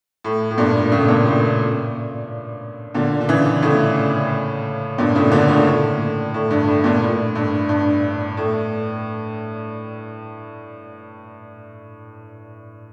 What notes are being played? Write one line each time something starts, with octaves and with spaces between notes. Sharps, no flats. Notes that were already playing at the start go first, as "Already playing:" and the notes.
A2
A2
G2 A#2
A2 C#3
G2 A#2
A2
A#2 D3
D3
C#3 E3
A2 C#3
G2 A#2
A2 C#3
A#2 D3
A2 C#3
A2
A2
G2
A2
G2 A#2
A2
G2
G2
A2